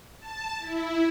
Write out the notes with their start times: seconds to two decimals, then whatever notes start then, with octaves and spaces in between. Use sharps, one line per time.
0.19 A5
0.59 E4